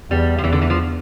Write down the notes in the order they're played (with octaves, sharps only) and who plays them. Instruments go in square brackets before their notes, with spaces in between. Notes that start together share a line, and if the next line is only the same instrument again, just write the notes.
[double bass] E2 [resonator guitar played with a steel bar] G3
[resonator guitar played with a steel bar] F3
[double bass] E2 [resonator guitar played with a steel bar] E3
[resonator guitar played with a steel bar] D3
E3
F3